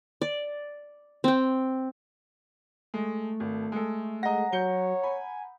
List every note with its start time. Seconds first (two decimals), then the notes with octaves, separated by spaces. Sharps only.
0.22 D5
1.24 C4 G5
2.94 G#3 A3
3.40 G#1
3.72 G#3 A4
4.23 G#3 D#5 F#5 A#5 A#6
4.52 F#3 C#5 G6 C#7 G7
5.03 G#5 B5